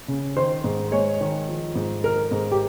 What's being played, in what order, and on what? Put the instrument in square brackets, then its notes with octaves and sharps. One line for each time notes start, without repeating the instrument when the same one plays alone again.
[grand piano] C#3
D#3 C5
G#2
G#3 C#5
D#3
F3
G#2
D#3 A#4
G#2
G4